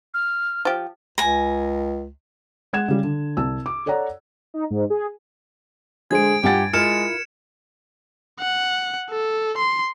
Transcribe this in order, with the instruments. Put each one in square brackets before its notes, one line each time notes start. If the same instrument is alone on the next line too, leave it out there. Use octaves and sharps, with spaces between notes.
[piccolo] F6
[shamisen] F3 G4
[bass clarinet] C#2 [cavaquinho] G#5 A#5
[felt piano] G#3 F#5 G#6 E7
C#3 G3
D3
C2 A5 E6
D6
A4 C#5 D5 F#5 A#5
[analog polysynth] D#4
G#2
G#4
[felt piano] D3 G#3 C5 [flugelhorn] G#4 [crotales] G#6 D7
[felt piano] G2 G#5 A6 [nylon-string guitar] F4 F#5 [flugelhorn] G4
[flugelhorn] G#3 [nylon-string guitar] E4 F4 A#4 [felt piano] F6 [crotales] C#7 E7
[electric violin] F#5
A4
C6